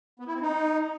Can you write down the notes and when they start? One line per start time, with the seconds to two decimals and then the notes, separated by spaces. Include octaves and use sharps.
0.20 B3
0.27 E4
0.34 C4
0.42 D#4